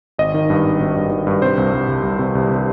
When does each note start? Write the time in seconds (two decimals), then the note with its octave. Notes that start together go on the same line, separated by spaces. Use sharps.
0.18 G#1 D#5
0.34 D#3
0.50 G2
0.65 G#1
0.80 G#1
0.96 G2
1.11 D#3
1.27 G2
1.42 C3 C5
1.57 C2
1.74 C2
1.88 C2
2.03 C2
2.19 C3
2.35 C2
2.50 C3